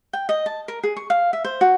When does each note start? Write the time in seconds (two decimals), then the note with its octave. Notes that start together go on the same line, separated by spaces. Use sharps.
0.13 G5
0.29 D#5
0.46 A5
0.68 A#4
0.83 G#4
0.97 C#6
1.10 F5
1.33 E5
1.45 C5
1.61 F#4